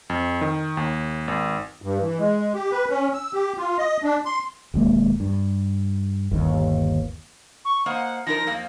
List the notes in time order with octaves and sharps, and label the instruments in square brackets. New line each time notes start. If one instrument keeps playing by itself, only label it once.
[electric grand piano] F2
D#3
D#2
G#1
[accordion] G2
E3
G#3
G4
B4
C#4
E6
G4
F4
D#5
D4
C6
[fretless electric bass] E1 D#2 G#3 A#3
G2
G1 D#2
[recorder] C#6
[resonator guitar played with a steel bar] A#3 C5 D#5 [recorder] F#5
[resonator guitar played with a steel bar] F3 D#4 A#4 [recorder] A#6
[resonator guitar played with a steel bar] F2 A#3 C4